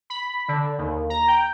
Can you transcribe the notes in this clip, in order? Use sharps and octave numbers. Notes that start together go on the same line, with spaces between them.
B5
D3
D#2
A#5
G5